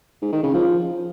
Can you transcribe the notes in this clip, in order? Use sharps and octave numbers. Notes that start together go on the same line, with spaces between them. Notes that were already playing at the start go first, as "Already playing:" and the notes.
G#2
D#3
C#3
F3